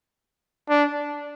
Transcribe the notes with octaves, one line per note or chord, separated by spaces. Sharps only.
D4